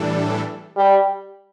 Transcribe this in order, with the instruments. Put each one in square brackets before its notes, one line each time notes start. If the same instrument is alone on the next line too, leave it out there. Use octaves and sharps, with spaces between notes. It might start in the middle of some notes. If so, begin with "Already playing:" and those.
Already playing: [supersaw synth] A2 E3 G3 D4 A4
[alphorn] G3